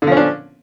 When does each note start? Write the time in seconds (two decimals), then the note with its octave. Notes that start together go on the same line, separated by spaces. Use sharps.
0.02 D3
0.07 F3
0.12 C#4
0.17 D4